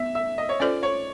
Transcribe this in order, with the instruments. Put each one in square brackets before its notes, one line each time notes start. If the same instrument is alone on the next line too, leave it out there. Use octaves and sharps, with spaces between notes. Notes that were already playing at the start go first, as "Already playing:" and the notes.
Already playing: [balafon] B3 [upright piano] E5
[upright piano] E5
D#5
C#5
[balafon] C#4 F4 A4 C5 [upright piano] D5
[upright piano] C#5